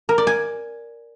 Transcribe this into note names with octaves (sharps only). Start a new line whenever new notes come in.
A#4
D5
G#5